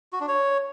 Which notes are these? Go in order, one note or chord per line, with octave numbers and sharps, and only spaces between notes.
F#4
D4
C#5